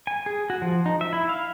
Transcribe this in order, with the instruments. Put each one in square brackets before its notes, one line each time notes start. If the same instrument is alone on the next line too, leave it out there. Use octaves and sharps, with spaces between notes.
[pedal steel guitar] G#5
G#4
F#4
F3
D#4
E5
E4
F5